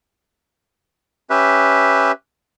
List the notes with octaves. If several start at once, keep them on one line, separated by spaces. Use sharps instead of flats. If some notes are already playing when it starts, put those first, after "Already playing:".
C#4 G4 B4 E5